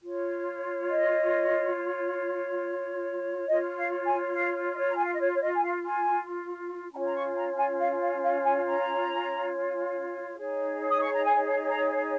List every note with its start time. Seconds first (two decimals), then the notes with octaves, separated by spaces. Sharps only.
0.02 F4 C#5
0.90 D#5
3.48 F4 C#5 D#5
3.77 F5
4.06 G#5
4.34 F5
4.72 D#5
4.77 C#5
4.88 A#5
4.97 G#5
5.04 F5
5.13 D#5
5.21 C#5
5.33 C#5
5.41 D#5
5.55 G#5
5.63 F5
5.85 G#5
6.92 C#4 F4 C#5 A#5
7.06 A#5
7.15 C#6
7.36 A#5
7.57 G#5
7.80 F5
8.00 F5
8.23 F5
8.44 G#5
8.66 A#5
10.38 D#4 G#4 C#5
10.89 D#6
11.01 C#6
11.12 A#5
11.24 G#5
11.68 A#5